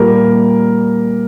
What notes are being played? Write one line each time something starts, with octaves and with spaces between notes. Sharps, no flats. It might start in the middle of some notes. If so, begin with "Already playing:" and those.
Already playing: A#2 G3 A#4